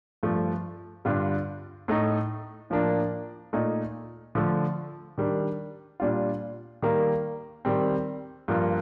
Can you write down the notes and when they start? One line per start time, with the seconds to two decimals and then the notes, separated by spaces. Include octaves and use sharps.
0.23 G2 F3 A3
1.05 G2 D3 G3 D4 F4
1.88 A2 A3 D#4
2.70 A2 F3 A#3 D4
3.53 A#2 A3 D#4
4.35 D3 F3 A3
5.18 D#3 G3 D4
6.00 A#2 G3 D4 F4
6.82 D#3 G3 A#3
7.65 D#3 G3 C4
8.48 G2 F3 A#3 F4